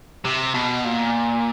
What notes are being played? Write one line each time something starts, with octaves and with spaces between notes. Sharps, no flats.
C3
B2
A#2